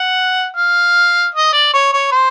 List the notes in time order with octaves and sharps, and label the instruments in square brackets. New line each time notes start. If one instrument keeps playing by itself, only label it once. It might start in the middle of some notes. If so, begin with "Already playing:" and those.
Already playing: [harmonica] F#5
F5
D#5
D5
C#5
C#5
C5